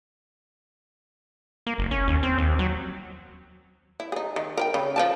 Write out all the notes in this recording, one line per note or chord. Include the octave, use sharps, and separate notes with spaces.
A#3
F#1
C#4
D#2
C4
D#2
F#3
E4
D#4 G#4
D#3
A#4 B4 G5
C#3
F3 A#4 A5